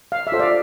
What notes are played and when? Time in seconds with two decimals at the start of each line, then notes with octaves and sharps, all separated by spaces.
0.12 F5
0.27 E5
0.32 F4 A4 C5
0.39 D5 F5